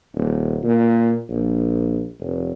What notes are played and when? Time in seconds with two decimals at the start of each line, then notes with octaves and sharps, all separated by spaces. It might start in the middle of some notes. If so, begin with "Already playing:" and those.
0.15 D#1
0.64 A#2
1.29 A#1
2.20 F1